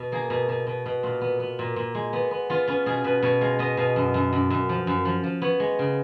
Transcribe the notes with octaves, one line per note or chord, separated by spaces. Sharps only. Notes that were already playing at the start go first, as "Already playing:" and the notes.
Already playing: B2
A#3 G#4
B2
B2
B2
B2
A#2 F4
B3
B3
A#2
A#2
G#3
B3
B3
B3 F4
B3 C#4
B2 G#4
B2 B4
B2 C#5
G#3 F5
B3 D#5
B2 F5
F#2
F#2
F#2
F#2
F3
F#2
F3
F3
B3 C#5
G#3
C#3